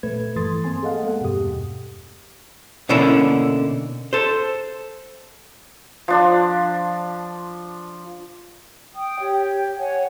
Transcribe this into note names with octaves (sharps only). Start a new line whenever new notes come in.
A#2 A3 B4 G#6
G2 E3 A4 C6 D#6 A6
A3 A#3 C4 G#5 C6
G#4 A4 D#5 F5 F#5
G#3 A#3 B3 A4 F#5
E2 G2 B2 G4 D#6
B2 D3 A#3 C#4 E4
A4 C5
F3 D4 C6
G5 D#6
G4 C#5
C#5 F#5 G#5